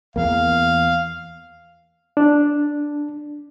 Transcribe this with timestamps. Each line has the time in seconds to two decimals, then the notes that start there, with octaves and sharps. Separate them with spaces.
0.16 E2 A#3 F5
2.17 D4